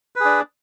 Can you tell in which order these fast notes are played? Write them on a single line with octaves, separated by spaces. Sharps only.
B4 G#4 D4